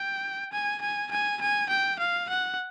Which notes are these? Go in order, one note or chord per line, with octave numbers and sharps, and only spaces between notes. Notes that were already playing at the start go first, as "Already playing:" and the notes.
Already playing: G5
G#5
G#5
G#5
G#5
G5
F5
F#5